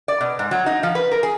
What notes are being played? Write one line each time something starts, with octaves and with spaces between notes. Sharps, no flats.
D5
B2
G#2
F#3
D#4
F3
B4
A#4
G#4